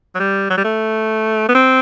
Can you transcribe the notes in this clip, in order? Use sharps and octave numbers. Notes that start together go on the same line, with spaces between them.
F#3
G3
F#3
G3
A3
B3
C4